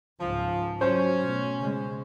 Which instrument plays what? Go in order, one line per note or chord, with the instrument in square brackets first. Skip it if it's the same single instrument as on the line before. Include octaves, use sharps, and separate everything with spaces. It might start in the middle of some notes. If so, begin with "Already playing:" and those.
[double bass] C#2 G#2 [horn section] F3
[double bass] F#3 [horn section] C#4 [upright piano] C5
[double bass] B2 A3
C#3 G#3